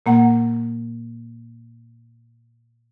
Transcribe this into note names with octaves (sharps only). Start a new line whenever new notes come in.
A#2 A#3 F#5